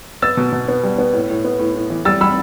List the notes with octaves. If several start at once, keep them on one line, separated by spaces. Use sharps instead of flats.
B3 E6 A6
B2
B2
B3
G3
B3
A2
A2
B3
A2
A2
E3
G3 E6 A6
G3 B5 E6